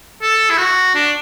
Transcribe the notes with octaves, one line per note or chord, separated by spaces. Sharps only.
A4
E4
F#4
D4